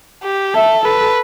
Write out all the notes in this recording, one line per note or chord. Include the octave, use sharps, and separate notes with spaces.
G4
A4 E5
A4 B4